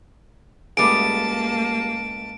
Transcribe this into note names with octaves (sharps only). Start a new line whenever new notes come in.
C#2 A2 G3 A#3 G#4 A5 D7